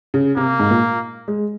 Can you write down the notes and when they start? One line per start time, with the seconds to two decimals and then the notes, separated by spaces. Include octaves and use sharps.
0.14 C#3
0.36 C3 A#3
0.60 G#2
0.71 A#2
1.28 G#3